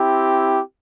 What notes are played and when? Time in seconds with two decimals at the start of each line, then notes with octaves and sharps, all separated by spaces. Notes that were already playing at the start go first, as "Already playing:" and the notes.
Already playing: C4 E4 G4